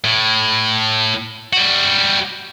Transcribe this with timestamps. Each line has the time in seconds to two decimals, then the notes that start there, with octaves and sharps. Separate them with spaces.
0.04 A2
1.53 G3 F#4